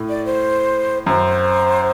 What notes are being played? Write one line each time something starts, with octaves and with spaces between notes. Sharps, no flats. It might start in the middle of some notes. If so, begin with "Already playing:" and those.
Already playing: A2
D5
C5
F#2 C5